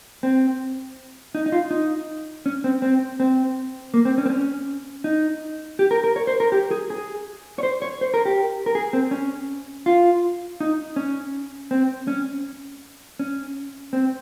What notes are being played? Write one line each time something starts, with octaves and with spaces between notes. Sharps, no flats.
C4
D#4
D#4
F4
D#4
C#4
C4
C4
C4
A#3
C4
C#4
C4
C#4
D#4
G4
A#4
A#4
C#5
C5
A#4
G4
G#4
G#4
C#5
C5
C#5
C5
A#4
G4
A#4
G#4
C4
C#4
F4
D#4
C#4
C4
C#4
C#4
C4